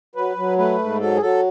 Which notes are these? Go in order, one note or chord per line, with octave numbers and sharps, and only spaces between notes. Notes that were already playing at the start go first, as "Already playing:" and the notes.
F#3 B4
F#3
A3 B4
G#2
F#3 A4
G#4
F#3 A4